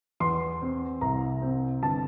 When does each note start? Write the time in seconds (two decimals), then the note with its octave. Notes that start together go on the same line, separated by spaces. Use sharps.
0.20 E2 C6
0.62 C4
1.01 C2 A#5
1.42 C4
1.83 G1 A5